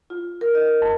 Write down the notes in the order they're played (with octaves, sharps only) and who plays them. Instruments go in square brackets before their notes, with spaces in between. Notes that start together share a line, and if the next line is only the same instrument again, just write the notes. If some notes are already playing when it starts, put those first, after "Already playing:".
[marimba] F4
A#4
D#5
F2